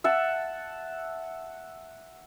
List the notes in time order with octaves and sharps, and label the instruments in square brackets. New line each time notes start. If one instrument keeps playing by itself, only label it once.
[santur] E5 F#5 A5